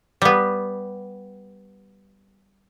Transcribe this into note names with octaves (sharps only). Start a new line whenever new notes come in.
G3 B3